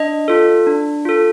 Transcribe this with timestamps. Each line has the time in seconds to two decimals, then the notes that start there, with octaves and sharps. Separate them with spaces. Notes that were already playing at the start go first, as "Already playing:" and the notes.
Already playing: D4 D#5
0.28 F4 A4
0.67 D4
1.05 F4 A4